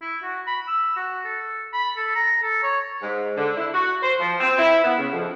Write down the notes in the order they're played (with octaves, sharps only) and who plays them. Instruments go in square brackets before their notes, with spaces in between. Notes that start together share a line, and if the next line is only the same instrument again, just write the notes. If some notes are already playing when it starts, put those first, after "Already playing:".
[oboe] E4
F#4
B5
E6
F#4
A4
B5
A4
A#5
A4
C#5
[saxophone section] G#2
D3
E4
F#4
C5
F3
C4
E4
B3
C#3
F2